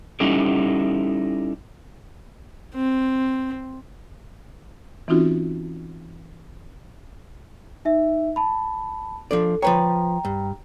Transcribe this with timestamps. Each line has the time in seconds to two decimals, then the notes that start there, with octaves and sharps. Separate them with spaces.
0.20 G3 C#4 D#4 E4 G4 A4
2.75 C4
5.08 E3 C4 C#4 D#4 F4 F#4
7.85 D#4 E5
8.36 A5 B5
9.31 F3 D4 A4 D5
9.62 F3 B4 C#5 G5 A#5
10.25 G2